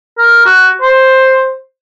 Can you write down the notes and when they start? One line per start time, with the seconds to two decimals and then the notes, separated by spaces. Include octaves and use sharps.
0.18 A#4
0.46 F#4
0.82 C5